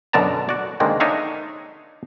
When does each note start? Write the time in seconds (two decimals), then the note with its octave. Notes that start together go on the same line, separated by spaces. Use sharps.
0.13 F#2 B2 D3 D5 A5 A#5
0.49 F#4 D5
0.80 D3 D#3 G#3 A#3 C4
1.00 D4 D#4 C#5 E5 F5